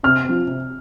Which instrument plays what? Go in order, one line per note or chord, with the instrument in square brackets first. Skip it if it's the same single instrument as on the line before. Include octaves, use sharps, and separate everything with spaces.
[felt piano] C3 [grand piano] F6
[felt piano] F3 C4
C3